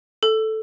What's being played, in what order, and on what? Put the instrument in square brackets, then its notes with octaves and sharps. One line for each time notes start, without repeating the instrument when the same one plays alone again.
[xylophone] A4